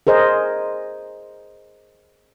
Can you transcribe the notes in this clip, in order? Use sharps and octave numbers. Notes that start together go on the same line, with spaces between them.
G#4 A#4 C5 D#5